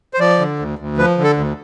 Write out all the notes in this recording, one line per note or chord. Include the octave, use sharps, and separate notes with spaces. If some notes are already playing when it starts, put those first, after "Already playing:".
C5
F3 D5
D3
D2
D2
F3 B4
D3
A4
D2